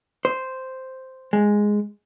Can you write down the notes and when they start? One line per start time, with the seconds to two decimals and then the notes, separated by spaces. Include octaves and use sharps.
0.25 C5
1.33 G#3